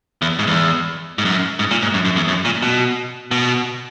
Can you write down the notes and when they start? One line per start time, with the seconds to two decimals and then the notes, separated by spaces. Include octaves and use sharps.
0.22 E2
0.39 G#2
0.47 E2
1.18 G#2
1.25 F#2
1.59 G#2
1.71 A#2
1.82 G#2
1.94 F#2
2.05 F#2
2.16 E2
2.28 F#2
2.45 A#2
2.62 B2
3.31 B2